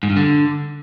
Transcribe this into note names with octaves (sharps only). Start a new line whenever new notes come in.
G#2
G2
D3